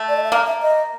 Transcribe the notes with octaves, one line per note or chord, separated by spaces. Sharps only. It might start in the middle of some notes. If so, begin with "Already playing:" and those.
Already playing: A3
D5
D#5
E5
A#3 F5
E5
D#5